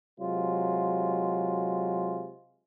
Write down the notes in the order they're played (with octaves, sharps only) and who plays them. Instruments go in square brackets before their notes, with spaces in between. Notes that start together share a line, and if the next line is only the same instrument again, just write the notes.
[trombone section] C3 F#3 G#3 F4